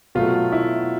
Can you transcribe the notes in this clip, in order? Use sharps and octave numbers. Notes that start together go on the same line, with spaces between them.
B2 F#3 A3 F4
E4